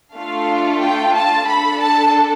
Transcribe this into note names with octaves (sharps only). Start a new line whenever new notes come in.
A3 D4 F4 F5
G5
A5
D4 A4 B5
A5